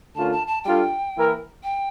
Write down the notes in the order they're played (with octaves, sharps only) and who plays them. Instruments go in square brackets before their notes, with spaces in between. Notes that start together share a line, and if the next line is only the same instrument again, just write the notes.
[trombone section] D3 A3 C#4 F4 A#4 [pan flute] A5
[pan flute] A5
A5
[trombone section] G3 D4 F4 A4 [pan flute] G5
[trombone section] E3 A#3 E4 A#4
[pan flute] G5